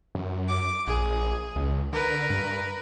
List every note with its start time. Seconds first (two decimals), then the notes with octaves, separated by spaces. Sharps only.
0.15 F#2
0.48 D6
0.87 A#1 G#4
1.56 C#2
1.93 D3 A#4 B4
2.30 G2